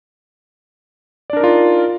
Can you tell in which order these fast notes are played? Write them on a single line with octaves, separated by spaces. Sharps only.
D5 D4 A#4 D#4 F4